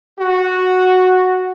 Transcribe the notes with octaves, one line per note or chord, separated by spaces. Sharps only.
F#4